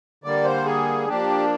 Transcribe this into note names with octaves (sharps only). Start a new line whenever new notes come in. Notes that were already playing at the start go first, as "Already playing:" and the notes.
D3 G3 A#3 D5
C5
G#4
F3 A#3 D4 G4